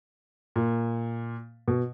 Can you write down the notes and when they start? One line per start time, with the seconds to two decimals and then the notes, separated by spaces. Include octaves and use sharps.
0.56 A#2
1.68 B2